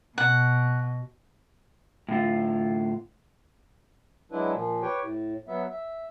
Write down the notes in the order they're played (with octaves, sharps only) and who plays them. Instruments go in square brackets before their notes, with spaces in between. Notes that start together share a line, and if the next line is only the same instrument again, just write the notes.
[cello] B2 [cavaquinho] F#5
[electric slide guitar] A2 D3 F4
[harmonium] F#3 G#3 D4 E4 B4
A#2 F3
G4 B4 C#5 G5
A2
F#3 B3 E5
E5